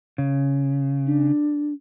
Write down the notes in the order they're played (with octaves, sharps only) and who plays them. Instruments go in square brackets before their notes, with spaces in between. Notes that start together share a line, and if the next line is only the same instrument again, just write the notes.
[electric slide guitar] C#3
[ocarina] D4